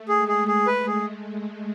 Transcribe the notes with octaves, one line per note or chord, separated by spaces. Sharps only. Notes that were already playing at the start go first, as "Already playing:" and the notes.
Already playing: A3
G#4
G#3
G#4
A3 G#4
B4
G#4